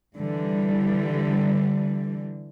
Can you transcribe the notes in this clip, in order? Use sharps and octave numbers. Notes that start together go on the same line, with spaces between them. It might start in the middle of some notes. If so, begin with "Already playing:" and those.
D3 E3 G3